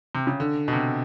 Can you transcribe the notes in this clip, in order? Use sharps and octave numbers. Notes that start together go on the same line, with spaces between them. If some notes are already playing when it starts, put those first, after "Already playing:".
C3
C#3
D3
B2
C3